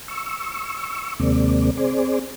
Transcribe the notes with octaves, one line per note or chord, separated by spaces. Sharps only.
C#6 E6
D#2 C3 G#3 A#3 C4 D5
C4 G#4 C5 D5